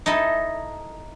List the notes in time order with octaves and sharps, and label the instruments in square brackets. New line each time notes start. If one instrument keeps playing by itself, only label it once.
[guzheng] D#4 E4 A4 D#5